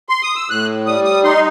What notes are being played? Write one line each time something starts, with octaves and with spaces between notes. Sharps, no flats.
C6
D#6
E6
A2 F#6
G3 D#6
D#6
D#4 C6